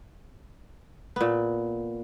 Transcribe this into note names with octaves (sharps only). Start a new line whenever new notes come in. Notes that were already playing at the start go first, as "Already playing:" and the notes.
A#2 B3